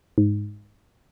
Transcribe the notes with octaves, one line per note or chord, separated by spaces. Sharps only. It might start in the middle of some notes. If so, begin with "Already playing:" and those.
G#2